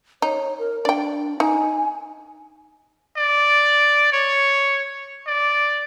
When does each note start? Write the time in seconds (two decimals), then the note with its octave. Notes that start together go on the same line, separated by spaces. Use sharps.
0.22 D#4 C#5
0.59 A#4
0.85 D4 D5 G5
1.40 D#4 G#5
3.17 D5
4.13 C#5
5.27 D5